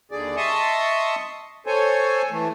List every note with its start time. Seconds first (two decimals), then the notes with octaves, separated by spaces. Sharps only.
0.11 D#2 D3 G#4 D5
0.37 D#5 E5 A5 C6 C#6 D#6
1.66 A4 C5 C#5 G#5
2.31 E3 A3